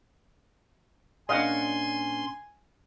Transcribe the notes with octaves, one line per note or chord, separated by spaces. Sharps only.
A#2 C#4 D4 D#5 F5 F#5 G#5 C6